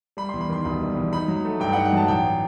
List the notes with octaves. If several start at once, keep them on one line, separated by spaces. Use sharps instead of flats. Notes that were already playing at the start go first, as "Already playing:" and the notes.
G3 B5
E2 C6
B5
D#3 C6
E1 B5
G3
E2
D#4 B5
F#3
A3
G2 G5
D#4 F#5
F#5
F#3 A5
A1 G5